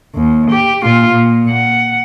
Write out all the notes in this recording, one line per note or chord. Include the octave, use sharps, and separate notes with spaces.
D#2
G4
A#2 F4
A#2
F#5